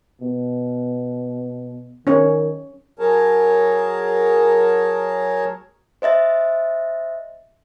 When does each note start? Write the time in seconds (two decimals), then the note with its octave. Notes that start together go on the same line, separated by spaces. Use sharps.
0.21 B2
2.07 D#3 C#4 C#5
2.99 F#3 G#4 A#4 C#5 A5
6.02 C5 D#5 E5 A6